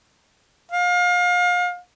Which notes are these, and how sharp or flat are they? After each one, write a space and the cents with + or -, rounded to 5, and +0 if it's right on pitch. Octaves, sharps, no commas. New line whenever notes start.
F5 +30